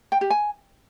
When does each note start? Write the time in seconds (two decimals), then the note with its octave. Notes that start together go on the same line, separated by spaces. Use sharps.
0.12 G5
0.21 G4
0.30 G#5